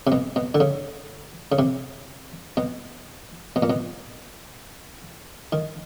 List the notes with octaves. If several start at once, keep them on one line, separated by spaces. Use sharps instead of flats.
C3
B2
B2
D3
C#3
C#3
C3
B2
B2
A#2
B2
D#3